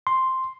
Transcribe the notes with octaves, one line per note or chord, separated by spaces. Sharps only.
C6